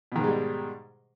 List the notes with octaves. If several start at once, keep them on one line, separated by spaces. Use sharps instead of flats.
G#2 B2 D#3 G3 G#3